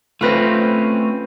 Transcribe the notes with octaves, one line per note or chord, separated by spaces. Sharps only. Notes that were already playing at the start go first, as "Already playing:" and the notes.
A3 C4 C#4 F4 B4 A#6